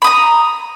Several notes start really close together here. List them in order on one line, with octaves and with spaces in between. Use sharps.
B5 D#6 A#5